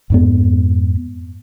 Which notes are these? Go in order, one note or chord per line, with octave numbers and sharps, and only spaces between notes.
F2 G#2 B3